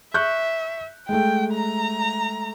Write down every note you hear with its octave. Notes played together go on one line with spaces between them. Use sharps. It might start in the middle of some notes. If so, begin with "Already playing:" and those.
E5 C#6 F#6 G6
G#3 A3 G5
A#5